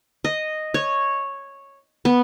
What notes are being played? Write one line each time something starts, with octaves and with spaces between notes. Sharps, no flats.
D#5
C#5
B3